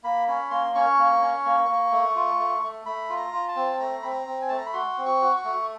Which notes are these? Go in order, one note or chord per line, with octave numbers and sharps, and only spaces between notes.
A#3 B5
C#4 B5
A#3 C6
C#4 C#6
A#3
C#4
A#3
A#3
A3
F4
A3
A3
A3 B5
F4
A#5
F4
A5
C4
A3 A#5
C4 B5
A#5
C4
G#5
A3 A5
A#5
B5
F#4 C6
C4
C#6
F#4
C#6
A3